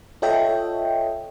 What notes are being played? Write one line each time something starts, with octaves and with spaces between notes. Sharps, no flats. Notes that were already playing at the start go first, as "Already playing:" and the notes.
F4 A4 C#5 D#5 E5 G5